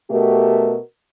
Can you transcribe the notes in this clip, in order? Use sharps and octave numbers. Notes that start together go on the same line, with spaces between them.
B2 A3 F#4 G4 A#4